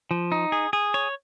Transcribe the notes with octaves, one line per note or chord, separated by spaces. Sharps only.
F3
D#4
G#4
G#4
C#5